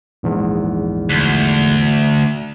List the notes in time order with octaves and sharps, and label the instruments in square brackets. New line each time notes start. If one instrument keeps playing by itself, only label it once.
[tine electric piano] A#1 E2 G#2
[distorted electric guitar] D2